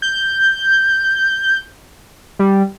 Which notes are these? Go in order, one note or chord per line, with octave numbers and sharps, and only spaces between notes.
G6
G3